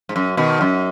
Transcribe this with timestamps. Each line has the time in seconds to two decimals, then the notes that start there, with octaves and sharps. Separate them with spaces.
0.09 G#2
0.16 F#2
0.37 B2 D#3
0.61 F#2